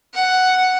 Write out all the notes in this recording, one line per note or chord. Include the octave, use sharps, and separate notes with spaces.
F#5